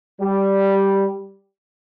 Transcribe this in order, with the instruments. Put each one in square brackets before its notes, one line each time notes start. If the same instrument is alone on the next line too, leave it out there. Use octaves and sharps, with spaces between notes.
[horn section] G3